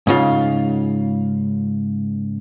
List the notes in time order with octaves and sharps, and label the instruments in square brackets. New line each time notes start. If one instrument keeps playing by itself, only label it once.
[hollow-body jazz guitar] G#2 C#3 F4